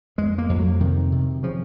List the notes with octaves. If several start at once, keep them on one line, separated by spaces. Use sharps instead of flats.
F2 G#3
A#3
F2
F#3
C3 D#3
C3
C#3 F3